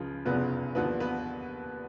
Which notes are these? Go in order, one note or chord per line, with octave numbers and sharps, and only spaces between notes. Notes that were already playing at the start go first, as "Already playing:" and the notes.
Already playing: C#2 C#3 F3
F1 E2 C#3 F3 B3 B4
D#2 D3 F3 B3 B4
B3 B4